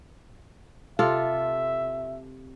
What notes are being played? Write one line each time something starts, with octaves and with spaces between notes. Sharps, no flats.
C3 F4 A4 E5